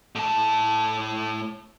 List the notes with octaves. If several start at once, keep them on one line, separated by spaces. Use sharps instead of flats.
A2 A5